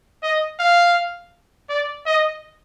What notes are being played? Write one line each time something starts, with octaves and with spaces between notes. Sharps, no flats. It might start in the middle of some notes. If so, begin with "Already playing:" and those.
D#5
F5
D5
D#5